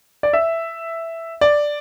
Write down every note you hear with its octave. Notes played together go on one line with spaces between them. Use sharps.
D5
E5
D5